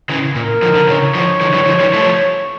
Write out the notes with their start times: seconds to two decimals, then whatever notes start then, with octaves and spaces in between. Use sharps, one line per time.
0.09 C#3 E3
0.35 A#2 A#4
0.62 D3 F3
0.75 D3
0.88 C#3 E3 C#5
1.14 D3 F3
1.41 D3 F3
1.54 E3 G3
1.67 D3 F3
1.80 E3 G3
1.93 F3 A3